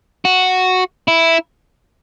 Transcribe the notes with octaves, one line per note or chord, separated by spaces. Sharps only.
F#4
E4